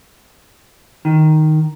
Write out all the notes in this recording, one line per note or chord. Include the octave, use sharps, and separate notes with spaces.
D#3